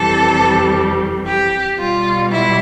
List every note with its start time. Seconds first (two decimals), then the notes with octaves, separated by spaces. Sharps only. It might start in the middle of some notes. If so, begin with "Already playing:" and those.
Already playing: F2 C3 E3 G3 A4
1.26 G4
1.78 B2 G3 F4
2.31 E4